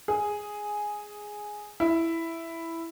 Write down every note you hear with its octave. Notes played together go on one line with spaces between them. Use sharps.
G#4
E4